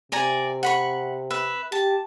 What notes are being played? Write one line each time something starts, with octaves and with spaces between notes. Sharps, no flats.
C3 D5 G#5 A#5
F#5 B5 C#6
B4 E5
G4 A5